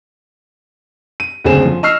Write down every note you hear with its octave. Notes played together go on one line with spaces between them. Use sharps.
D#7
F#1 D2 C4 G#4 E7
F3
D#5 C#6 E6 F6 C7